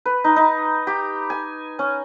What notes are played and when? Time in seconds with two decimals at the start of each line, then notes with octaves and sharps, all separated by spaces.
0.05 B4
0.24 D#4
0.36 D#4
0.87 G4
1.30 G#5
1.79 C#4